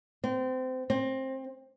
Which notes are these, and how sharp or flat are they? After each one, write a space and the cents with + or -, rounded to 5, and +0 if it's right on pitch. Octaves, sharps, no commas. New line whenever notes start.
C4 -25
C4 +20